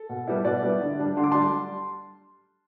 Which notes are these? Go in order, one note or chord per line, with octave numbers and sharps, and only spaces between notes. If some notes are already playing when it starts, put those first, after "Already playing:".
Already playing: A4
B2
G3 B3 E4
B2 B4 D5
G3 B3 E4
D3
G3 D4
D3 C6
D6
G3 D4 A5 C6